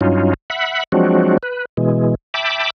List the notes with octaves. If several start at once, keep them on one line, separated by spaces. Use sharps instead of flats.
G2 F#3 C#4 D#4 F4
E5 F#5 B5
F3 F#3 G#3 C4 D4 F#4
B4
B2 E3 G#3
E5 G5 A5 B5 D6